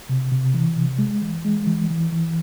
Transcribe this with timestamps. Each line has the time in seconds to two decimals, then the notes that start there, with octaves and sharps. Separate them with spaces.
0.09 C3
0.31 C3
0.54 E3
0.76 C3
0.99 G#3
1.22 E3
1.45 G#3
1.67 E3
1.90 E3
2.12 E3